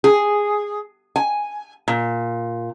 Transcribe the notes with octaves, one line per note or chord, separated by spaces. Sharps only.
G#4
G#5
A#2